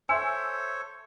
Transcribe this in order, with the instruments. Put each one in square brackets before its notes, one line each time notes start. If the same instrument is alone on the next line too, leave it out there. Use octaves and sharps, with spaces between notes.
[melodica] A4 C5 C#5 [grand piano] E5 E6 [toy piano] G#5 C6